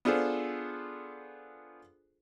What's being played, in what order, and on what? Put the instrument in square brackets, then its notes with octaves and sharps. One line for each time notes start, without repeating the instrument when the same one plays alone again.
[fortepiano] B3 D4 F4 G#4 A4 C5